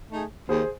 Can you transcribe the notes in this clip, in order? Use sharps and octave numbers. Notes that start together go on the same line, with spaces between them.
A3 D#4 G#4
D#2 G#4 C5